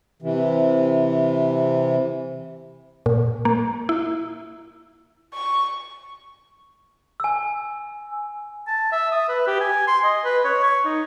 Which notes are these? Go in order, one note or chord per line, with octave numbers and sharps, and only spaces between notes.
C3 E3
A#2
A#3
E4
C#6
G#5 E6
A5
E5
D#6
B4
G4
G#5
C6
D#5
B4
C#5
C#6
D#4